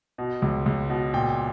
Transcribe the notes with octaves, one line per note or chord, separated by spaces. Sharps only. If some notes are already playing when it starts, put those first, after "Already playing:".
B2
C#2
C#2
B2
A#2 G5